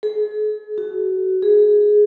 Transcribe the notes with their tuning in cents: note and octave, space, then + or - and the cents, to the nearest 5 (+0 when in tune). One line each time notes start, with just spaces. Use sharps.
G#4 +40
F#4 +25
G#4 +5